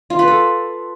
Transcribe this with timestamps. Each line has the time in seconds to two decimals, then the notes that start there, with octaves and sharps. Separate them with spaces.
0.10 F4
0.19 B4
0.28 A4